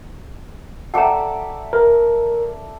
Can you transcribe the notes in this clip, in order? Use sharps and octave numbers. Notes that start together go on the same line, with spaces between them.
A4 D5 E5 F#5 G5 A#5
A#4